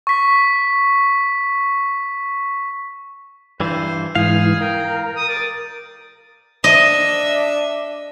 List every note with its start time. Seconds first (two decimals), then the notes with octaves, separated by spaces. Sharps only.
0.07 C#6 B6
3.60 G2 E3 C5
4.15 G#2 E3 G#4 F5
4.61 A#4 G5
5.16 D#6
5.29 D5
6.64 D4 D#5 E5